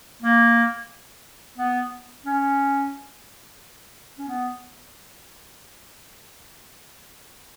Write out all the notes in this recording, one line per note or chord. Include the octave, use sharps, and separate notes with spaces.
A#3
B3
C#4
C#4
B3